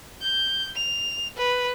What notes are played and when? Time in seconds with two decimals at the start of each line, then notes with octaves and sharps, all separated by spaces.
0.21 G6
0.76 F7
1.37 B4